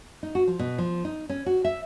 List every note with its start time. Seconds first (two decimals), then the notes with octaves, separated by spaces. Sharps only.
0.23 D#4
0.35 F#4
0.47 F3
0.59 B2
0.78 F3
1.05 D#4
1.29 C#4
1.46 F#4
1.65 E5